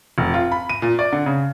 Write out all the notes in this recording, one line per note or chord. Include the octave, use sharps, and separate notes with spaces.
F1
F4
B5
D#7
A#2
D5
D3
C#3